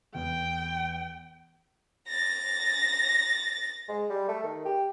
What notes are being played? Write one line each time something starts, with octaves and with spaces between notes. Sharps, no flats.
E2 G5
A6 A#6
G#3
G3
A3
D#3
G4